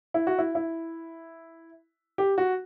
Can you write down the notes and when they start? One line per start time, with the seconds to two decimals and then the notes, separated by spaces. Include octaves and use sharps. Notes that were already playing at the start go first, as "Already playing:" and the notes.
0.14 E4
0.27 F#4
0.38 E4
0.55 E4
2.18 G4
2.38 F#4